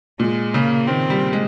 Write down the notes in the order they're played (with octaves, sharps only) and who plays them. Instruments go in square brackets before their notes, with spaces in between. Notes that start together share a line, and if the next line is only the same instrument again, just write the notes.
[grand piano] A#2 [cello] G#3
[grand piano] C#3 [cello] A#3
[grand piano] D#3 [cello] C4
[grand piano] G3
G#3